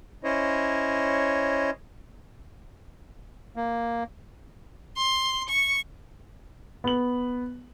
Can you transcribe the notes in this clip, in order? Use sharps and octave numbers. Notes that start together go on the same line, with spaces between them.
C#4 E4 C5 C#5 D#5
A#3
C6
C#6
B3 F#7